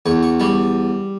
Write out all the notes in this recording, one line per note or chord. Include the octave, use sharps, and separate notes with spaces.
E2 C#6
C#6
G3 C#6